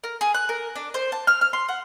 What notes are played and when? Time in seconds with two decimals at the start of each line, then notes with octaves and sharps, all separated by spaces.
0.04 A#4
0.21 G#4
0.34 F#6
0.49 A#4
0.76 D4
0.94 C5
1.12 A5
1.27 F6
1.41 F6
1.53 C6
1.69 F#5